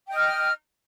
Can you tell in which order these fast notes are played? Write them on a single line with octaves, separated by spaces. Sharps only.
G5 D#5 F6